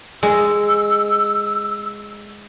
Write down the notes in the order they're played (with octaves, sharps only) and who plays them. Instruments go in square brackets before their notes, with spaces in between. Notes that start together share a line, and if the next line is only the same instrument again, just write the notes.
[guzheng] G#3 [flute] E6